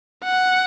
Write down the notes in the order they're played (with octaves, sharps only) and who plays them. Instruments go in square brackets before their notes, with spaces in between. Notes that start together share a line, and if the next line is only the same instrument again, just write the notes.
[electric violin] F#5